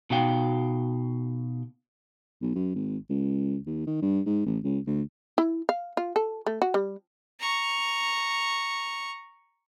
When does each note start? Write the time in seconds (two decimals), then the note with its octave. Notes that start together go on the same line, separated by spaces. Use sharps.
0.10 B2 D#4 F#4 F5 G5
2.42 B1
2.55 F#2
2.75 G#1
3.10 C#2
3.67 D#2
3.87 D#3
4.02 G2
4.26 G#2
4.46 A1
4.64 C#2
4.87 D2
5.38 E4
5.69 F5
5.97 F4
6.16 A4
6.46 A3
6.62 F#4
6.74 G3
7.40 A#5 C#6